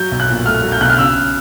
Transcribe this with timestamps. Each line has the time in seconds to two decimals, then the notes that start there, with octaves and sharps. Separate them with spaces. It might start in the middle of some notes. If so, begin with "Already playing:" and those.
Already playing: F#3 G6
0.11 B1
0.20 F#6
0.29 A#2
0.46 A3 F6
0.63 F#3
0.72 G6
0.81 B1 F#6
0.90 F6
0.99 C#3 E6